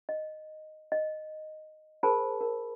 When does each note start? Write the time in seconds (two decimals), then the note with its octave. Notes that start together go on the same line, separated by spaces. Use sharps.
0.09 D#5
0.92 D#5
2.03 G#4 A#4 C5 A5 B5
2.41 A#4